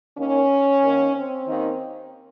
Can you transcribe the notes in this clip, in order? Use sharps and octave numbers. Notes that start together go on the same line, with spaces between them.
D#2 D#3 C#4
D#2 D#3
C4
D#2 D#3